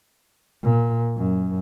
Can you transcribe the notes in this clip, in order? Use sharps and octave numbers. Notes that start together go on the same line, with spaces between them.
A#2
F#2